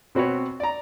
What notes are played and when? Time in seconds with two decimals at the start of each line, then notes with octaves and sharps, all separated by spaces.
0.15 B2 C4 F#4 B4 C#5
0.60 D5 A#5